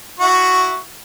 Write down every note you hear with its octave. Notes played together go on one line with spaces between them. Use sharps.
E4 F#4 C#6